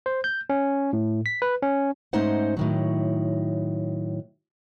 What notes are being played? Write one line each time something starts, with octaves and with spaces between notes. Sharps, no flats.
C5
G6
C#4
A2
B6
B4
C#4
G#2 A3 C#4 D#4 C5 F#5
A2 D#3 F#3